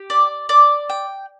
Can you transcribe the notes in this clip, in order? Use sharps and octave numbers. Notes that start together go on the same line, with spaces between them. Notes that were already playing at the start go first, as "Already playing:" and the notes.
Already playing: G4
D5
D5
G5